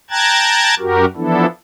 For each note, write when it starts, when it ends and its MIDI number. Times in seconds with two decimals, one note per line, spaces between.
0.10 0.75 79
0.10 0.75 81
0.10 0.75 82
0.10 0.75 90
0.10 0.75 92
0.10 0.75 93
0.79 1.05 42
0.79 1.05 66
0.79 1.05 67
0.79 1.05 70
1.16 1.46 52
1.16 1.46 53
1.16 1.46 59
1.16 1.46 62
1.16 1.46 64
1.16 1.46 69